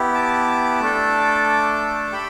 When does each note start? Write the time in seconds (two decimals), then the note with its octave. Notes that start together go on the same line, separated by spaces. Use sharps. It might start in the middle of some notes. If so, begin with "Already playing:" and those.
Already playing: B3 E4 G4
0.14 A5 D6
0.80 A3 D4 A4
2.13 G4 G5 B5